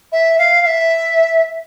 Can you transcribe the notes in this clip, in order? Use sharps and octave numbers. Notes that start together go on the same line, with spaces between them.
E5
F5
F5
E5